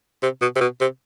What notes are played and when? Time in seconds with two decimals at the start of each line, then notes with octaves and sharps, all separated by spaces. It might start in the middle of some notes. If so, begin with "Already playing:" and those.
0.22 C3
0.41 B2
0.56 C3
0.61 B2
0.81 C3